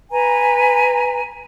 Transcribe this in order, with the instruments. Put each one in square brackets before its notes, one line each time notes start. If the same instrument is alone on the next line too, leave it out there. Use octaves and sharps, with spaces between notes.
[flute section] B4 G#5 A#5